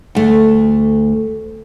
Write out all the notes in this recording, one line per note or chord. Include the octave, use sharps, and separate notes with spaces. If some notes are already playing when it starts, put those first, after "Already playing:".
D2 A3